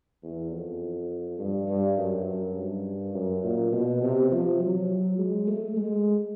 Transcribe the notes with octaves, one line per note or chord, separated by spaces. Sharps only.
E2
F2
G2
G2
F#2
F#2
G2
F#2
A#2
B2
C3
F3
F#3
G#3
A3
G#3